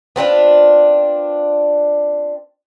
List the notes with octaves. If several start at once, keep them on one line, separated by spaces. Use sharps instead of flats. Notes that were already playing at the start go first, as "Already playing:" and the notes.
B3 C4 D4 F4